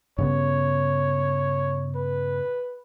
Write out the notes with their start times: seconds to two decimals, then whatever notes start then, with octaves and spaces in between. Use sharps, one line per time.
0.18 G2 C#3 B3 C#5
1.95 B4